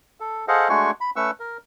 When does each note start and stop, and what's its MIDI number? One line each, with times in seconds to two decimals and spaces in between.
0.20 0.45 69
0.48 0.68 68
0.48 0.68 69
0.48 0.68 72
0.48 0.68 75
0.48 0.68 77
0.48 0.68 78
0.69 0.91 56
0.69 0.91 57
0.69 0.91 62
0.69 0.91 66
0.69 0.91 80
0.69 0.91 85
1.01 1.10 83
1.16 1.31 57
1.16 1.31 61
1.16 1.31 71
1.16 1.31 85
1.16 1.31 88
1.40 1.57 70